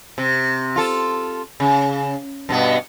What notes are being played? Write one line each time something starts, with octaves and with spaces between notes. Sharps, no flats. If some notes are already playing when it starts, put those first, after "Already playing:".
C3
F4 A4
C#3
G2 B2 B3